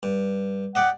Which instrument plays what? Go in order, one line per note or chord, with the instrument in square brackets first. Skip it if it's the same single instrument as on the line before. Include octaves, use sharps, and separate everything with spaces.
[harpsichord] G2
[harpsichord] G4 D5 D#5 [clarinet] F#5